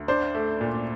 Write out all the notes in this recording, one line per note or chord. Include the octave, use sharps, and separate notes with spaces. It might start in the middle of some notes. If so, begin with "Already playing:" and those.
Already playing: D2
D4 C5
A3
A#2